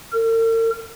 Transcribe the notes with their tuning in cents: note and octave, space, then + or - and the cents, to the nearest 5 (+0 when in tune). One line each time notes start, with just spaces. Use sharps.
A#4 -45